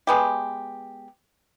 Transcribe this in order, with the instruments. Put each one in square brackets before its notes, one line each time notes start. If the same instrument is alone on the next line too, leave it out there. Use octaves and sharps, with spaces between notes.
[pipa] G#3 B3 G4